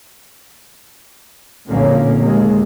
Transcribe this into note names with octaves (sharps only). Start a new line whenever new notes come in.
B1 F2 A#2 D3 A#3 C#4
D#2 G#3